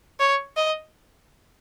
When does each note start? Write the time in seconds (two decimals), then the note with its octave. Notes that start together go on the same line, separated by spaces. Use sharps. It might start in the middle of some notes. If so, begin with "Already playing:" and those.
0.20 C#5
0.57 D#5